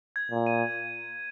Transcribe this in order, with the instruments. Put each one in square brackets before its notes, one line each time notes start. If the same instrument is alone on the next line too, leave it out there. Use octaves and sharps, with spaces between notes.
[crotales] G#6
[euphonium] A#2
[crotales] D#7